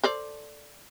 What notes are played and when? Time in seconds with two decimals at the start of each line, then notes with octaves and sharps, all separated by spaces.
0.04 A4 C5 D5